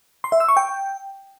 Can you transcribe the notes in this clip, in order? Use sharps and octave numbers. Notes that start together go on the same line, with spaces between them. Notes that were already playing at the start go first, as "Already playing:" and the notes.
C6
E5
E6
C#6
G5